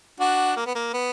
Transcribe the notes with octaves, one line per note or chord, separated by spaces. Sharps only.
D4 F#4
A#3
B3
A#3
B3